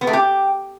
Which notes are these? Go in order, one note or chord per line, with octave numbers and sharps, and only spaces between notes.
B3
A3
G4